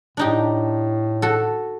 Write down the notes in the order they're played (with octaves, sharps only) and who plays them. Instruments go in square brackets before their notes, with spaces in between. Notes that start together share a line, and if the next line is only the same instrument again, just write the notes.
[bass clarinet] A2 [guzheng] D4 D#4 G4
[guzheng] F#4 A4